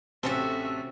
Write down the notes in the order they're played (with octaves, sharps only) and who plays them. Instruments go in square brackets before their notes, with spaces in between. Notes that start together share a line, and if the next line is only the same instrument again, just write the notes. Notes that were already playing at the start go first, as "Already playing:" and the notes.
[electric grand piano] A1 C3 A5 [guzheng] C4 C#4 A4 [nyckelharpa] F#4 E5